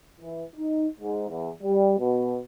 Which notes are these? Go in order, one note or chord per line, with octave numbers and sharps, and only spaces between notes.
E3
D#4
G#2
E2
G3
B2